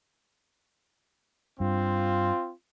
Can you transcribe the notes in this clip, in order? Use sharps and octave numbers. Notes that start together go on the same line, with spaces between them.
G2 C4 F4